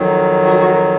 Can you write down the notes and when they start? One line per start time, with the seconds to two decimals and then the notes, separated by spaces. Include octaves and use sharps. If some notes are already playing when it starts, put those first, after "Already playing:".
Already playing: F2 D#3 F#3
0.45 F#4
0.60 F#4
0.74 A#4